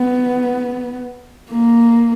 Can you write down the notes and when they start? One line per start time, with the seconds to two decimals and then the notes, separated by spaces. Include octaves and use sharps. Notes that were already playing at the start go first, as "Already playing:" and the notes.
Already playing: B3
1.51 A#3